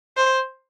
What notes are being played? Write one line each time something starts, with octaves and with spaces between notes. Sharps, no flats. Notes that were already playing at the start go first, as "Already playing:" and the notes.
C5